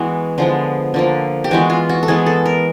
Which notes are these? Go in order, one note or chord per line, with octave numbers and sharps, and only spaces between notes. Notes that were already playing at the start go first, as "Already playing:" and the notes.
Already playing: E3 G#3 B3 F#4 B4
D3 F3 G#3 B3
D3 F3 A#3
G4
E3 G#3 B3 F#4
F4
F#4
A4
E3 G#3 B3 G#4
A4
A#4